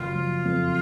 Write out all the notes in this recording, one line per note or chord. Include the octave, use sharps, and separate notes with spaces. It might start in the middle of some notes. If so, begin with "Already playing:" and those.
Already playing: F#1 F4
F3
F2